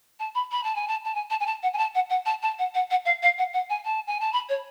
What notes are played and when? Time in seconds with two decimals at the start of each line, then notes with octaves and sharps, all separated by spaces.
0.20 A5
0.35 B5
0.52 B5
0.64 A5
0.75 G#5
0.88 A5
1.05 A5
1.15 G#5
1.30 A5
1.40 G#5
1.46 A5
1.63 F#5
1.73 G#5
1.78 A5
1.95 F#5
2.10 F#5
2.26 A5
2.43 A5
2.59 F#5
2.75 F#5
2.91 F#5
3.05 F5
3.22 F5
3.38 F#5
3.53 F#5
3.70 G#5
3.85 A5
4.07 G#5
4.20 A5
4.33 B5
4.49 C#5